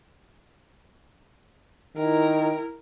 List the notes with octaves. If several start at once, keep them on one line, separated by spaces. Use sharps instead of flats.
D#3 E4 A#4